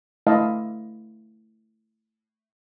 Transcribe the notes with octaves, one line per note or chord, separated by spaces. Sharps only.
A3 E4 D5 D#5 F5 A5